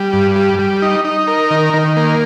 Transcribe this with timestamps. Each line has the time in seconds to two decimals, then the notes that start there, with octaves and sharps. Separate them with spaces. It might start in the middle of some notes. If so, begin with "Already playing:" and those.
Already playing: G3
0.13 G2
0.36 G3
0.59 G3
0.82 D#4
1.05 D#4
1.27 A#4
1.51 D#3
1.73 D#3
1.97 A#3